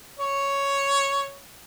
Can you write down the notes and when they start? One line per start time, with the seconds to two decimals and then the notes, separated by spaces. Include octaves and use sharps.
0.19 C#5